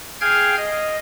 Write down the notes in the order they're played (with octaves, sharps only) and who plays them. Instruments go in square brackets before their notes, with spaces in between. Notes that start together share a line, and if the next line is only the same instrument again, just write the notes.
[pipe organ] G#4 F5 G5 F6 G#6
D#5